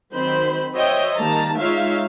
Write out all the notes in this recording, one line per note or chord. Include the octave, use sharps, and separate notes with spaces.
D#3 F#3 C4 C5 B5
F#4 C5 C#5 D#5 E5 G5
D#3 G3 A#3 A5 A#5
G#3 D#4 F4 C#5 E5 F5